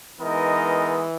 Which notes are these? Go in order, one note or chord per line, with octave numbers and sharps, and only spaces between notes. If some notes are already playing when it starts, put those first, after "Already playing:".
E3 G#3 B3 D#4 A#4 D#5